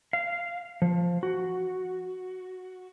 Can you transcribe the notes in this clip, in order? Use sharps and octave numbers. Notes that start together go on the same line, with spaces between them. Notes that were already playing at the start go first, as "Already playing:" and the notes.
F5
F3
F#4